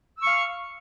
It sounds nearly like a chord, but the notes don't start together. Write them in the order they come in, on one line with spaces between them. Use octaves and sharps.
E6 C#6 F5